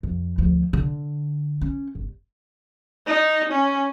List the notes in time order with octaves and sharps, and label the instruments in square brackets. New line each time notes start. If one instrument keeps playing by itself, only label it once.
[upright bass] F2
D2 F3
D3
C#4
G1
[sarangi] D#4
C#4